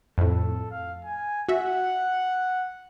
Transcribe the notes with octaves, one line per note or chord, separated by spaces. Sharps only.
F2 A2 A4
F5
G#5
F#4 E5 F#5